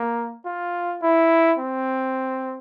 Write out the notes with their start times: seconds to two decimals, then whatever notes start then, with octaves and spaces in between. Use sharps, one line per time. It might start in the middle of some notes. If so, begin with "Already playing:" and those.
Already playing: A#3
0.45 F4
1.02 E4
1.59 C4